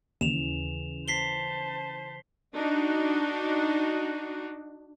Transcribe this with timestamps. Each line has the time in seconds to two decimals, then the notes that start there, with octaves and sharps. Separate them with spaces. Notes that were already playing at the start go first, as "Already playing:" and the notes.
0.21 D#2 C#3 E3 C#4 E7 F7
1.08 C5 A5 B6 C7 G7
2.54 D4 D#4 F#4